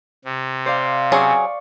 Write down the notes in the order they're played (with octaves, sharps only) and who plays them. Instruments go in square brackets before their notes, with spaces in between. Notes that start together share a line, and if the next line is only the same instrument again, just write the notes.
[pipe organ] C3
[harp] C5 D5 F5
[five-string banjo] F#3 C#4 G#4 [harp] D5 C#6